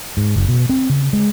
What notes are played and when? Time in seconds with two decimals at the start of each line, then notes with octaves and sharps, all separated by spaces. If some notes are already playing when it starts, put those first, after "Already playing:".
0.17 G#2
0.36 F#1
0.48 B2
0.69 C4
0.90 C#3
1.13 G#3